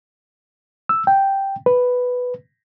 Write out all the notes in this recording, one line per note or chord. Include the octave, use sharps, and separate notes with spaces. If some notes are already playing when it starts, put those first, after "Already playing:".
E6
G5
B4